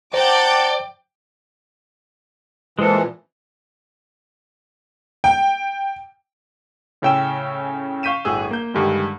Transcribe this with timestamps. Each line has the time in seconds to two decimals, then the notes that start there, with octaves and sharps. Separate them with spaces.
0.14 C5 D5 F#5 G5 A5 A#5 D6 G6
2.79 A#2 E3 F3 G#3 A4
5.24 G5
7.02 A2 C#3 C#4 G5 E6 E7
8.03 F5 C#6 G6 B6 D#7 E7
8.25 G1 A2 F#4 G#4 E6
8.51 A#3 G6
8.74 G2 D3 D#3 G3 G#3